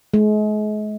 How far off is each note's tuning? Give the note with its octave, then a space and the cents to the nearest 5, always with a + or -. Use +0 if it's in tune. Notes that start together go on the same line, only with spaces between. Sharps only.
G#3 +40